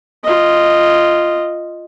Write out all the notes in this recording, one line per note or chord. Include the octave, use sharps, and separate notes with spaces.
F4 D#5